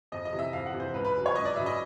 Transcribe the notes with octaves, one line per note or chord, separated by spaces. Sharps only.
F2 D#5
D#5
C3 E3
E5
F2 F5
F#5
C3 E3
C5
C#2 B4
B4
C#3 F#3
C#5
C#2 D#5
D5
C#3 F#3 E5
D#5